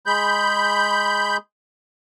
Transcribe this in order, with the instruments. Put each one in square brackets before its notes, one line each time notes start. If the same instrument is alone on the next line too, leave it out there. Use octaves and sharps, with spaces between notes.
[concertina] G#3 G#4 [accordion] B5 G6